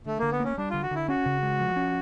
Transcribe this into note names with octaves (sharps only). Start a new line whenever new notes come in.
D3 A3
D3 A#3
B3
A#3 C#4
G3 D4
D3 F4
F#4
D3 E4
C#4 F#4
C#3
G#3
F3
C#4